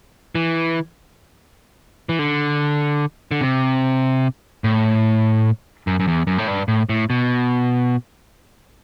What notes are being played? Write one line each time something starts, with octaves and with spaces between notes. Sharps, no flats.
E3
E3
D3
D3
C3
A2
F#2
F#2
E2
F#2
A2
G2
A2
A2
B2